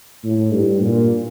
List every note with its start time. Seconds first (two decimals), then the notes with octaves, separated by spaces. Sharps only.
0.24 A2
0.52 G2
0.81 A#2